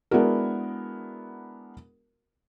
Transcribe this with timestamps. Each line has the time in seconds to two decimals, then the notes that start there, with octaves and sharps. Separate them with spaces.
0.11 G#3 B3 D4 E4 F#4 A#4